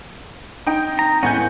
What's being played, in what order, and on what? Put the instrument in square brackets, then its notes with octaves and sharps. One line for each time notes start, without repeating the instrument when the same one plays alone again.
[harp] C4 [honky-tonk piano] D#4 G5
[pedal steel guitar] A#5
[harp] E2 A2 [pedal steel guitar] G#3 B3 C#4 [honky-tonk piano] F#5 G#5 G6